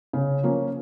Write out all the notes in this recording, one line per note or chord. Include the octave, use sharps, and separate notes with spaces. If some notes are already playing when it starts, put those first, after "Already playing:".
C#3
F3 A#3 C#4